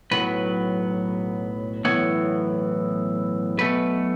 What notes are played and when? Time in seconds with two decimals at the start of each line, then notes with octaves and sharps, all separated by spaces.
0.11 B1 A2 F#3 B3 B4
1.85 B1 A2 E3 B3 C#5
3.58 B1 B2 A3 B4